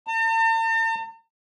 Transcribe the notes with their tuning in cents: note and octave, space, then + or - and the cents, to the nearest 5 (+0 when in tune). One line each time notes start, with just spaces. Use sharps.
A5 +45